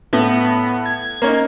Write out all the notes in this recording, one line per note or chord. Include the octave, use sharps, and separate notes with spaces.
A2 B3
G#6
A#3 C#4 D#4